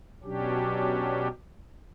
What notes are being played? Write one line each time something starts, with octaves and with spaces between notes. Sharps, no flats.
B2 F#3 C#4 D4 G4